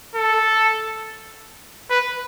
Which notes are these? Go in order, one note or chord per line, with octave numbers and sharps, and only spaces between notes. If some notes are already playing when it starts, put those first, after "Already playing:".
A4
B4